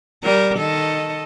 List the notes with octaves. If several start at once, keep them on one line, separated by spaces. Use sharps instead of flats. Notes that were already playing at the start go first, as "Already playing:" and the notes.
G3 A#4
D#3 A4 D#5